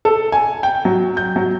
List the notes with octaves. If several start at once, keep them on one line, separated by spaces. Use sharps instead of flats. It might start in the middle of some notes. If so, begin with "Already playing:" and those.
A4
G#5
G5
F#3
G6
F#3